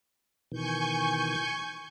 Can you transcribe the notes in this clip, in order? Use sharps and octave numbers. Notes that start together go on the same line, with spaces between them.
B2 D#3 E3 G#5 C#6 G6